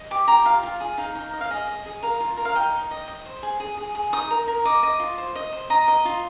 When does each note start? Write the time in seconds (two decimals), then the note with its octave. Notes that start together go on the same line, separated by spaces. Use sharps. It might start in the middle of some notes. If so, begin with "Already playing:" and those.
Already playing: D#5
0.11 G4 D6
0.28 G4 A#5
0.45 F4 F5
0.63 F4
0.80 G#4
0.98 D#4 F5
1.15 D#4
1.33 D#5
1.41 F5
1.51 G#4 D#5
1.67 D#5
1.86 G#4
2.02 A#4 F5
2.20 F4
2.37 A#4
2.45 F5
2.55 D#5 G5
2.73 D#4
2.91 D#5
3.08 D#5
3.26 C5
3.43 G#4
3.60 G#4
3.78 G#4
3.95 G#4
4.12 D#4 D#6
4.30 A#4
4.48 A#4
4.65 D#5 D6
4.83 D#5
5.00 F4
5.18 C5
5.35 D#5
5.53 C5
5.70 D#5 A#5
5.88 D#5
6.05 F4